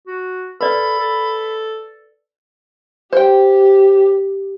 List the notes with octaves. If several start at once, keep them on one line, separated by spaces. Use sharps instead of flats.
F#4
A4 B4 D5 B5
A4
G4 C5 G5